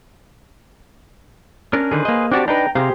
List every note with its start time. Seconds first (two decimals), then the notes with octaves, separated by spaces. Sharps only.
1.73 C#4 D4 A#4
1.91 D3 D#3 G#4 B4 C5
2.05 A#3 D#5
2.32 C4 D4 F#4 G4 D5 A5
2.48 D4 D#4 B4 G5 A#5
2.75 C3 G4 G#4 C5 F5 A#5